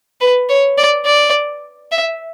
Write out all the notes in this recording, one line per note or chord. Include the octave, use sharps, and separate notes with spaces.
B4
C#5
D5
D5
E5